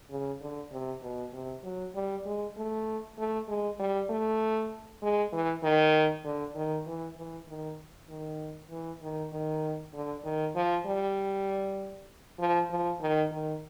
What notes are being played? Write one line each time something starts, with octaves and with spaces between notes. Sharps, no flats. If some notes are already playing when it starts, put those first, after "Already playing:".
C#3
D3
C3
B2
C3
F#3
G3
G#3
A3
A3
G#3
G3
A3
G#3
E3
D#3
D3
D#3
E3
E3
D#3
D#3
E3
D#3
D#3
D3
D#3
F3
G3
F3
F3
D#3
D#3